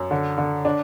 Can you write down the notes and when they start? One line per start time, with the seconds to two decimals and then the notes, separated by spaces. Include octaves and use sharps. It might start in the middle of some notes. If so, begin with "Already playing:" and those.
Already playing: F#2
0.11 D3
0.38 D3
0.65 D4